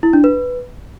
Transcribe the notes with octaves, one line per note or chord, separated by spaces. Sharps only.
E4
D4
B4